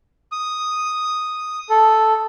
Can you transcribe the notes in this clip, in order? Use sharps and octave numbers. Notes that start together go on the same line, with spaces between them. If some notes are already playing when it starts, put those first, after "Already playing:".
D#6
A4